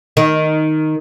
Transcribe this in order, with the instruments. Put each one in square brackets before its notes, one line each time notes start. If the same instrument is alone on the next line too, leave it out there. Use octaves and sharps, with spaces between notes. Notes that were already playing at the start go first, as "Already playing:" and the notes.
[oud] D#3